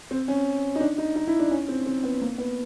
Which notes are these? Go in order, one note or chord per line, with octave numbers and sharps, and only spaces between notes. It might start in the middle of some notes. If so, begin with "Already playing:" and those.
C4
C#4
D#4
D4
D#4
D#4
E4
D4
C#4
C4
C4
B3
A#3
B3